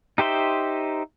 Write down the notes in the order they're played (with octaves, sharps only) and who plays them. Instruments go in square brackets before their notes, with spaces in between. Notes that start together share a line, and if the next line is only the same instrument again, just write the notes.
[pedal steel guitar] D#4 G4 C5 E5 C6